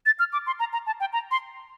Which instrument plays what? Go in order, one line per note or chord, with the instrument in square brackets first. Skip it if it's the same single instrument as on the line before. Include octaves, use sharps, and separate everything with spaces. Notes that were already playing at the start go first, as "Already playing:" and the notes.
[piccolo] A6
F6
D6
C6
A#5
A#5
A5
G5
A#5
C6